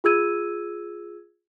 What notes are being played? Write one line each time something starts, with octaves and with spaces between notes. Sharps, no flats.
F4 G#4 E6 G#6 D#7